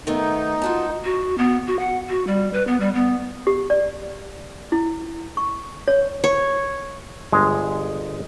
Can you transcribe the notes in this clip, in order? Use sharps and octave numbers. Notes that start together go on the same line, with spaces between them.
D#3 A3 B3 D#4
F4 F#4 A5
F#4
B3
F#4
F#5
F#4
G3
B4
B3
G3
B3
G4
D5
E4
C#6
C#5
C#5
G1 G#3